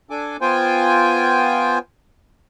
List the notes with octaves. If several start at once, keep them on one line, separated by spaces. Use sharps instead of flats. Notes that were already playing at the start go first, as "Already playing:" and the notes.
D4 A4 G#5 D6
B3 F4 C5 G5 G#5